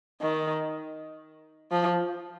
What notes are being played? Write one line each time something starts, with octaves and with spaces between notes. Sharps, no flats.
D#3
F3